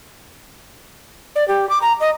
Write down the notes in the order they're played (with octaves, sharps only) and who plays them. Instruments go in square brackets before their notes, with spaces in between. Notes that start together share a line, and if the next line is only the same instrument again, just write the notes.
[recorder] D5
G4
D6
A#5
D#5